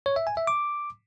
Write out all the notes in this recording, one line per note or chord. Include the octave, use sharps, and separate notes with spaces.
C#5
E5
G#5
E5
D6